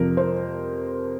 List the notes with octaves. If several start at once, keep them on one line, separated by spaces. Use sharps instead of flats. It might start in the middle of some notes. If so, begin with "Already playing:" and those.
Already playing: F2 C3 F3 A#4
C5